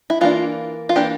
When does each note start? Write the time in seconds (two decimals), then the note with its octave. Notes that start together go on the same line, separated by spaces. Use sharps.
0.10 E4
0.21 E3 A#3 D4 F4
0.89 F4
0.96 E3 A#3 D4 G4